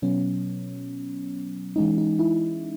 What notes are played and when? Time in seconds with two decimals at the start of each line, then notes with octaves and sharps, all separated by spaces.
0.02 B2 F#3 B3 C#4
1.76 E3 G#3 C#4 D#4
1.98 D#4
2.19 E4